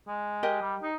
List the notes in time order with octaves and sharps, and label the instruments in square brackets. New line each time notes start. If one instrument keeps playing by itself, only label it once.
[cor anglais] G#3
[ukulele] G4 A#4 D#5
[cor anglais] G3
D#4